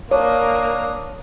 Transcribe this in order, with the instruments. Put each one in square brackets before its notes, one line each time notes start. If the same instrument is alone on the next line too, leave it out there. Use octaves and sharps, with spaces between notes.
[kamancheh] A#3 A#4 [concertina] D4 D#6 [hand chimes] C#5